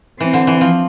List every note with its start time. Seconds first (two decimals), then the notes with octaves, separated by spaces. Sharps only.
0.20 E3 C4
0.33 D3
0.47 E3
0.61 F3